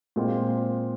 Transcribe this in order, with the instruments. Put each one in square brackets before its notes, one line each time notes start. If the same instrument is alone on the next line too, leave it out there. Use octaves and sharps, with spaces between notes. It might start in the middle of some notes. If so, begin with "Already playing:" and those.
[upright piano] A#2 G#3 C4 F4 C5